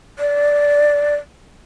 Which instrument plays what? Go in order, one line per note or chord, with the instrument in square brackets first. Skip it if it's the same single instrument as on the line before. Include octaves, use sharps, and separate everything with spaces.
[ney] D5